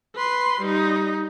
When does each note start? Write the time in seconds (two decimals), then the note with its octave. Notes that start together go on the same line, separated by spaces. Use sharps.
0.16 B4 C6
0.61 G3 D#4